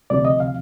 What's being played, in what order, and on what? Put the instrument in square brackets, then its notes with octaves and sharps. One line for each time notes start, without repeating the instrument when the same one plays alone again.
[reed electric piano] D2 C3 F3 D5
D#5
F5